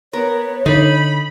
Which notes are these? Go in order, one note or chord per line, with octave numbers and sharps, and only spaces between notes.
B3 A#4 C#5
D3 D#4 B5